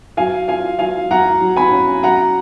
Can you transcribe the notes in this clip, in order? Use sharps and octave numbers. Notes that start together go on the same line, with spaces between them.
F#3 F5 G#5
F4 F5 G#5
F#3 F5 G#5
F#3 F#5 A#5
F#3
G#5 B5
C#4
F#3 F#5 A#5